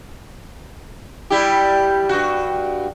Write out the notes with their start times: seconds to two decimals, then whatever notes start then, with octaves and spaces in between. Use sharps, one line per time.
1.30 G3 E4 G4
2.09 G2 F#4